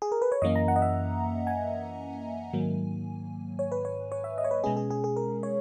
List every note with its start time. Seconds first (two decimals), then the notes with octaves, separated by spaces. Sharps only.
0.02 G#4
0.12 A#4
0.22 B4
0.32 C#5
0.42 F#2 E3 A#3 C#4 D#5
0.56 A#5
0.68 F#5
0.76 D#5
0.82 E5
1.47 G#5
2.53 G#2 D#3 F#3 A#3
3.59 C#5
3.72 B4
3.85 C#5
4.12 C#5
4.24 E5
4.38 D#5
4.44 C#5
4.51 B4
4.64 B2 G#3 C#4 G#4
4.77 G#4
4.90 G#4
5.04 G#4
5.17 A#4
5.43 C#5